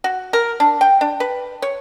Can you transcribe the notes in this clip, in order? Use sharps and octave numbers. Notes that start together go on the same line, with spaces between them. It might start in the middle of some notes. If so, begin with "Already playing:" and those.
F#4
A#4
D4
G5
D4
B4
C#5